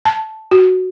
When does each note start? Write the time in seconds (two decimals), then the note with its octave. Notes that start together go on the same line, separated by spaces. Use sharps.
0.05 A5
0.51 F#4